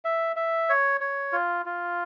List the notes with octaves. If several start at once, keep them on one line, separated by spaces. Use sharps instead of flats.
E5
E5
C#5
C#5
F4
F4